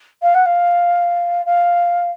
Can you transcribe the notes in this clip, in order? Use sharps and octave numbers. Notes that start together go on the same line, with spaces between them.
F5
F#5
F5
F5